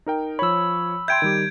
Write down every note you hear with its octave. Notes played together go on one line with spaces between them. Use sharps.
D#4 A#4 G5
F3 C#5 B5 E6
E5 G5 C6 G6 G#6 D7
D#3 G3 G4